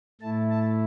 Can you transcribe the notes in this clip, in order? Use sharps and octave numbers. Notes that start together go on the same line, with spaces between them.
A2 A3 E4 A5
A5